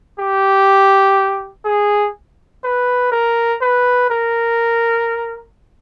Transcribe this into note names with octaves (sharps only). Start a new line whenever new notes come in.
G4
G#4
B4
A#4
B4
A#4